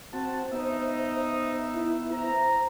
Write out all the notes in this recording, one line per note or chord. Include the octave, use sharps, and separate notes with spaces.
C4 F#4 C5 A5
B3 D#4 E5
E4
C5 A#5